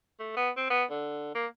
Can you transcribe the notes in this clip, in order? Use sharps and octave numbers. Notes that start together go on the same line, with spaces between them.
A3
B3
C4
B3
D3
A#3